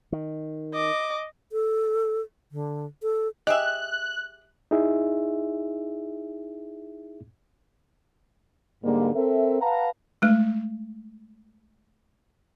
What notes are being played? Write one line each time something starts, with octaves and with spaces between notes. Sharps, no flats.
D#3
D#5 D6
A4
D3
A4
G4 G#4 D#5 E5 F#6
D#4 E4 G#4 E5
G#2 D3 G3 G#3 A#3
C4 A4 A#4 E5
B4 F5 F#5 A5 A#5
G#3 A3